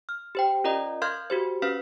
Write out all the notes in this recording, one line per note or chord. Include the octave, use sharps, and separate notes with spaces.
F6
G4 C5 G5
C#4 F4 A#4 D5 D#5 A#5
A#4 F5 C6 F6 G6 G#6
F#4 G4 C5
C#4 B4 F5 F6 B6